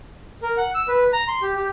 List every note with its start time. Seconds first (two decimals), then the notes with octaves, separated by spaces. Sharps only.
0.42 A#4
0.57 F#5
0.75 E6
0.88 B4
1.13 A#5
1.28 C6
1.42 G4
1.56 G4